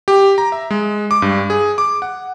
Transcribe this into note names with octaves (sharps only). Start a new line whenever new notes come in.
G4
A#5
E5
G#3
D6
G2
G#4
D6
F#5